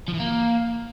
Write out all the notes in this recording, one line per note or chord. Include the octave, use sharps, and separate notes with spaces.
F3
E3
A#3